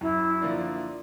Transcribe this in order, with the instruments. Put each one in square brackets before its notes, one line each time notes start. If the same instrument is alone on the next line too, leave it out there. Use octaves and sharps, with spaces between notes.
[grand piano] F#2 [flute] E4
[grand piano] D3 F3 A#3 D4